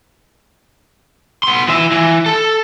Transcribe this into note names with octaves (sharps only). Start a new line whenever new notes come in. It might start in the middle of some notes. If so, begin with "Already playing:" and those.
B3 C6
E3 E5
E3
A4